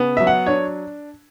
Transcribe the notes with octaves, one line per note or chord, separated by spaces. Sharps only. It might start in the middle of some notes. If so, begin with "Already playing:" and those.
Already playing: C#3 B3
F#3 E5
F#5
D4 C#5